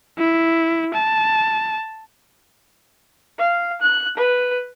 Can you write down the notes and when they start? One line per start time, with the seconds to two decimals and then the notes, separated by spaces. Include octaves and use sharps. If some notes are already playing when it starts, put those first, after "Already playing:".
0.18 E4
0.94 A5
3.38 F5
3.81 F#6
4.17 B4